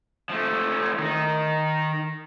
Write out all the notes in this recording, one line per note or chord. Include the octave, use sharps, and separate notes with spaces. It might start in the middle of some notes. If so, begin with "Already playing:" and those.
F3 A3
D#3 D#4